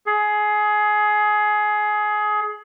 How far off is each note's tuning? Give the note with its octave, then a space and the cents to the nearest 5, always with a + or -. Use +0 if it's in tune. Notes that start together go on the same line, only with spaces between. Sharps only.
G#4 +20